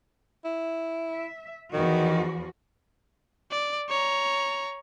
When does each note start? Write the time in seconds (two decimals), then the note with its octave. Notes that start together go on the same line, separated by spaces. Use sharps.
0.45 E4
1.12 E5
1.73 E2 D#3 F3 F#4
3.51 D5
3.89 C#5 A#5